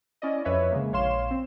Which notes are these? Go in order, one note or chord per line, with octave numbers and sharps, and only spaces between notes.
C#4 E4 D5 D#5
F2 B4 C#5 E5
C#3 G#3 A#3
A#1 C#5 F5 C6 E7
C4